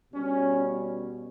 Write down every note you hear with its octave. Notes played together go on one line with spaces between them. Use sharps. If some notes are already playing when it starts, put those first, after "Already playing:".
B2 G3 C#4
C#4